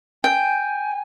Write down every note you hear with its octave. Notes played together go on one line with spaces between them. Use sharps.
G5 G#5